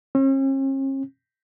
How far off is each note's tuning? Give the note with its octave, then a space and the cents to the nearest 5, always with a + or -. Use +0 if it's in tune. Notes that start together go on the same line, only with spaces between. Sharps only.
C#4 -45